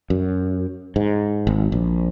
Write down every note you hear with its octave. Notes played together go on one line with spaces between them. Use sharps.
F#2
G#2
G#1
A#1